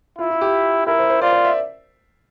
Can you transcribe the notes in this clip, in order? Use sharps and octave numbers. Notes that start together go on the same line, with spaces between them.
E4 F4
F4
G4
E4 A#4
C5
C5
F4 D5
D5
E5